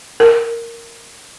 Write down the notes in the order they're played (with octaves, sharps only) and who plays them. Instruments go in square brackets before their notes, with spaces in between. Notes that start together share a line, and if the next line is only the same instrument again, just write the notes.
[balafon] A#4